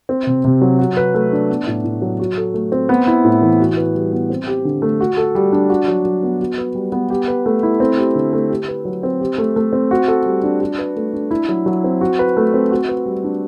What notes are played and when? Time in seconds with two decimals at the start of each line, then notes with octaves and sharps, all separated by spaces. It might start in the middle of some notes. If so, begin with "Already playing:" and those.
0.09 C4
0.27 C3
0.44 C3
0.61 F#3
0.79 F#4
0.97 B4
1.14 A3
1.32 D4
1.49 B3
1.67 A2
1.84 A2
2.02 F#3
2.20 F#4
2.37 A4
2.54 A3
2.72 C4
2.89 B3
3.07 E4
3.25 A2
3.42 E3
3.60 F#4
3.77 B4
3.95 G3
4.12 B3
4.30 C4
4.47 G4
4.65 D3
4.82 A3
5.00 F#4
5.17 A4
5.35 G3
5.52 D4
5.70 F#4
5.88 F#3
6.05 F#3
6.23 B3
6.40 F#4
6.58 B4
6.75 G3
6.92 B3
7.10 G4
7.28 B4
7.46 A3
7.63 E4
7.80 C4
7.97 G4
8.15 D3
8.33 A3
8.50 G4
8.68 B4
8.85 F#3
9.03 C4
9.21 G4
9.38 A3
9.56 A3
9.73 C4
9.91 F#4
10.08 A4
10.26 G3
10.44 D4
10.61 F#4
10.79 B4
10.96 A3
11.13 D4
11.31 E4
11.49 F#3
11.66 F#3
11.84 C4
12.01 F#4
12.19 B4
12.37 A3
12.54 C4
12.71 F#4
12.89 B4
13.06 G3
13.24 D4